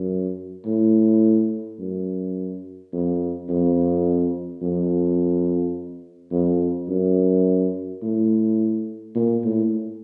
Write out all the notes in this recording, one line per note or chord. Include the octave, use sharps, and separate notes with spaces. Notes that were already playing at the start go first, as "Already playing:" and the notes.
Already playing: F#2
A2
F#2
F2
F2
F2
F2
F#2
A2
A#2
A2